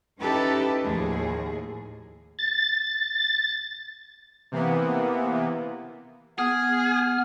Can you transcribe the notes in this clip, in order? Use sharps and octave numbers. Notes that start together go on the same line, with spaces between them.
C#4 D#4 E4 G4 A4 B4
D#2 A2 F3 G#4
A6
C3 E3 A#3 B3
B3 G#4 F6